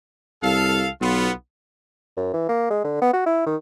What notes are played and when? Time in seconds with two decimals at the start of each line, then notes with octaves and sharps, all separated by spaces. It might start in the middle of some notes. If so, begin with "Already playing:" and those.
0.43 C2 A4 F5
1.01 B1 B3 F4
2.16 F#2
2.33 E3
2.49 A#3
2.70 G#3
2.84 D3
3.02 B3
3.13 F#4
3.26 E4
3.46 D#3